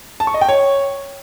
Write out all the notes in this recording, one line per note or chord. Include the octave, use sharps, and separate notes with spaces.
A5
C#6
D#5
G5
C#5